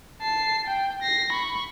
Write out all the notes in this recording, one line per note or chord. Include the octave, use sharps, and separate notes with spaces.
A5 C7
G5
A#6 C7
B5 C#6